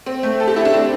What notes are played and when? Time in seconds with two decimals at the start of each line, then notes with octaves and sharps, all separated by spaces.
0.06 C4
0.23 A3
0.40 A4
0.47 G4
0.56 E4
0.65 D4
0.73 C4